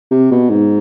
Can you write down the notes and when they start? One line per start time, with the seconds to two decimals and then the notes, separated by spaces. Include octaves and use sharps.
0.11 C3
0.31 B2
0.50 G#2